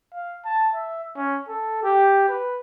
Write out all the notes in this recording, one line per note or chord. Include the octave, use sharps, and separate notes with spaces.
F5
A5
E5
C#4
A4
G4
B4